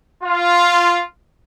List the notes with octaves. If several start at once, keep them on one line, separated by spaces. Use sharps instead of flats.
F4